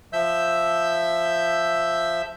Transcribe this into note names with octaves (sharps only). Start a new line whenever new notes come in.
F3 E5 E6 G6